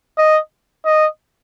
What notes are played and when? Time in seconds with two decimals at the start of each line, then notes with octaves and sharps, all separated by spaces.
0.18 D#5
0.86 D#5